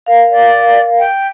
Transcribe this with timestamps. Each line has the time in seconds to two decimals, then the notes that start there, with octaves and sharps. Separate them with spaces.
0.06 A#4 F5
0.31 D5
0.99 G5